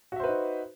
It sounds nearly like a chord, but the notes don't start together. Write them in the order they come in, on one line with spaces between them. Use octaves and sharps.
F#4 E5 C5 B4 D#4